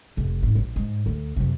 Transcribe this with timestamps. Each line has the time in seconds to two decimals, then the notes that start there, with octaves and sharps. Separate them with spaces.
0.17 F1
0.43 G#2
0.55 A#1
0.76 G#2
1.06 D2
1.36 F#2 C3